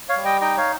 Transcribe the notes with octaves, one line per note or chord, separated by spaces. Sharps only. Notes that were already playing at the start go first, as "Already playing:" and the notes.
C#5 F5
G3
D#5 G5
D#4 D#5 G5
C#5 F5